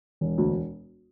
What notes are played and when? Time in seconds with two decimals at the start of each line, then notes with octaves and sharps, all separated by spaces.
0.21 E1
0.38 D2